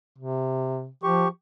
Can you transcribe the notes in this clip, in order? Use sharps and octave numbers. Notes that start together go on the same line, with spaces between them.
C3
F3 G4 C#6